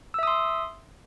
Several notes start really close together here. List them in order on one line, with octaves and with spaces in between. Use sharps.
E6 E5 D#6 C6